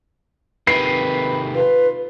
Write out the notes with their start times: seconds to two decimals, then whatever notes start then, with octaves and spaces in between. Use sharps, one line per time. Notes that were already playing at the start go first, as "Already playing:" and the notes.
0.67 C3 D#3 B4 C7
1.55 F4 B4